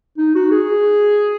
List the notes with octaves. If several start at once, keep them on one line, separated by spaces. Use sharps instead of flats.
D#4
F#4
G#4